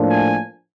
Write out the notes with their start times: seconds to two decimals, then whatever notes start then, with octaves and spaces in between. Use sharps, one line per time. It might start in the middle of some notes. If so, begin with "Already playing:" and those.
Already playing: A2 F3 A#3 D4
0.10 G#5